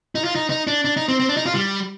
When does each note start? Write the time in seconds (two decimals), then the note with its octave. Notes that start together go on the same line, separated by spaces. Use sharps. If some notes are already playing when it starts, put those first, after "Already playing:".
0.15 D#4
0.24 F4
0.35 D#4
0.50 D#4
0.67 D4
0.85 D4
0.97 D#4
1.08 C4
1.20 C4
1.29 D4
1.37 D#4
1.46 F4
1.55 G3